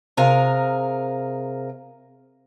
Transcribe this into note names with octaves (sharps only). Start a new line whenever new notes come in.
C3 G#4 A#4 F5